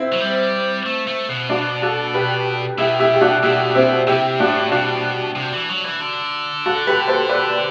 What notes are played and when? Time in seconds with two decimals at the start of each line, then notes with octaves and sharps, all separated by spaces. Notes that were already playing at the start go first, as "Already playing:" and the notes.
Already playing: C4 E4
0.12 F#3
0.21 G3
0.86 A3
1.07 A3
1.29 B2
1.49 D4 F#4
1.82 F#4 A4
2.14 G4 B4
2.78 B2 E4 G4
3.00 E4 G4
3.15 G4
3.21 D4 F#4
3.43 B2 E4 G4
3.75 C4 E4
4.07 C3 E4 G4
4.40 A2 D4 F#4
4.72 B2 D4 F#4
5.36 C3
5.53 E3
5.69 F#3
5.84 E3
6.01 D3
6.66 F#4 A4
6.87 G4 B4
7.08 A4 C5
7.29 B4 D5